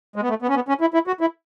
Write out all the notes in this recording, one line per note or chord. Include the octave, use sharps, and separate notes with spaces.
G#3
B3
A3
B3
C#4
B3
C#4
E4
E4
F#4
E4